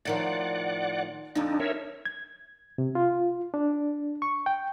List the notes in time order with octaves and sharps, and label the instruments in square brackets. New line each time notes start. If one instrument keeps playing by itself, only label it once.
[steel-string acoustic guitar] A2 D#3 F3 [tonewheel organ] D5 F#5
[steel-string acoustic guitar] F2 D3 [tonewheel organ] D4 D#4
[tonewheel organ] A#4 C#5 E5
[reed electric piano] G#6
C3
F4
D4
C#6
G5